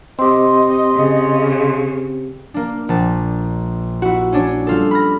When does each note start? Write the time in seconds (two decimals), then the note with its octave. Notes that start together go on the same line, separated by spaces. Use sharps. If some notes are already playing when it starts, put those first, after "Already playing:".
0.19 C4 G4 D#5 C6
0.95 C#3
2.54 A#3 D4
2.89 A#1 A5
4.02 E4 F#4
4.32 C#4 D4 C#5
4.67 G3 F4 A4
4.91 B5 F6 A#6